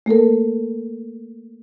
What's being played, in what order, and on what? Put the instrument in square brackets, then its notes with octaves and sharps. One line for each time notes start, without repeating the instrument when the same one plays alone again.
[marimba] A3 A#3 A4 A#4